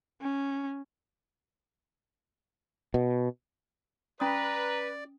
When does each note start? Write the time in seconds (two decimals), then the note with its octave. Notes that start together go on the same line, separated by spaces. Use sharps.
0.21 C#4
2.94 B2
4.20 C#4 B4 D5 A#5 D#6